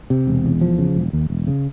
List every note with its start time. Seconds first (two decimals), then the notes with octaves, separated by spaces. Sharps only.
0.10 C3
0.27 E1
0.45 E2
0.61 F3
0.78 C#3
0.96 E1
1.13 D#2
1.30 E1
1.47 C#3